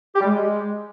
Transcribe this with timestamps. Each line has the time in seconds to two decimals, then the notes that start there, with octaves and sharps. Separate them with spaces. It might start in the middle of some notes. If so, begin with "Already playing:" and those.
0.15 G4
0.20 G3
0.26 G#3